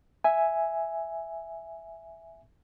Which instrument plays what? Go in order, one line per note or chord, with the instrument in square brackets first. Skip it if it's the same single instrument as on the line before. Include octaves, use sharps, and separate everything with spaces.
[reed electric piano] E5 G#5